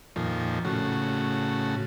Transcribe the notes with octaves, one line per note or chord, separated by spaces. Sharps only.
F2 A#2 D#3 F3
A2 C#3 F#4